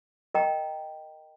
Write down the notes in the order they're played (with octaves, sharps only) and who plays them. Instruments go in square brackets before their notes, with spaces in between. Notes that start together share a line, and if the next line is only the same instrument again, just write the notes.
[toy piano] A#4 D#5 G5 A#5